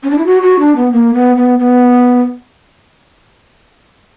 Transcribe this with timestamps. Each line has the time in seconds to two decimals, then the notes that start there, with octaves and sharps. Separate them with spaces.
0.03 C#4
0.10 D4
0.18 E4
0.26 F#4
0.42 F#4
0.59 D4
0.76 B3
0.92 A#3
1.14 B3
1.36 B3
1.59 B3